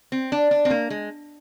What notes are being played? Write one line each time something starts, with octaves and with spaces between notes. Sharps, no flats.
C4
D4
D4
C4
A#3
G#3